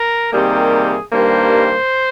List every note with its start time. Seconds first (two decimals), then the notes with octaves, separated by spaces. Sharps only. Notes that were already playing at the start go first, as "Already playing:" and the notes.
Already playing: A#4
0.31 C3 D#3 G3 A#3 G#4
1.12 G2 D#3 G3 A#3 C5